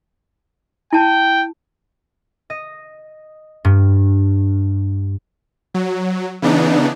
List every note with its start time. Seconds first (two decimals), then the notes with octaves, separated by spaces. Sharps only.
0.93 E4 G5 A5
2.50 D#5
3.65 G2
5.74 F#3
6.42 C#3 E3 B3 D4 D#4